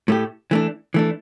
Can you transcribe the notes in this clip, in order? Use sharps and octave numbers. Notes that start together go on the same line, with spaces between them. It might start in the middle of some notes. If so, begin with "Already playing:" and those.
A2 A3 G4
E3 A3 D4
E3 A3 D4